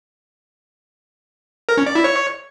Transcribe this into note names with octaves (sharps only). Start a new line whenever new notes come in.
A#4
C#4
D5
E4
C#5